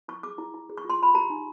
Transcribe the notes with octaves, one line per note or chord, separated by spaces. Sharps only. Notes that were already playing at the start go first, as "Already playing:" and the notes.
E4 C#6
G#4 D6
E4
E4
G#4
C#6
F4 C6
F4 B5
G4 A#5
D#4